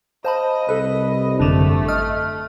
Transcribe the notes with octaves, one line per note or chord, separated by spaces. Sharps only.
C5 D#5 F5 A5 B5
C2 A4 B4 B5
G#1 F#2 D3 A3 D4
D#5 F6